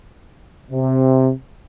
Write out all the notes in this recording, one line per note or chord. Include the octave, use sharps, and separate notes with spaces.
C3